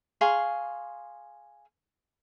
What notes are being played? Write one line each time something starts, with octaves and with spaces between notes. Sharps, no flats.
G#4 F5 C6 C#6